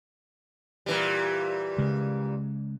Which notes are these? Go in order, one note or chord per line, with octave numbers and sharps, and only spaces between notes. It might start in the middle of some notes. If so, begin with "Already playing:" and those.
A#2 E3 G3
C#3 G#3